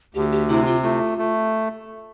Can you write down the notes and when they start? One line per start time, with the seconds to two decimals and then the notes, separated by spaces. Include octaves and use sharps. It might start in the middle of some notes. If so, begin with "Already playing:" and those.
0.14 D2 G4
0.32 G4
0.48 C3 E4
0.66 F4
0.83 A3 F4
1.18 A3